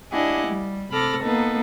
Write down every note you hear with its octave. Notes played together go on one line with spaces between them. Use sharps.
D4 E4 G4 D#5 F#5 G#5
G3
C3 A4 B5 D6 F6 A#6
A#3 B3 D#4 A4 B4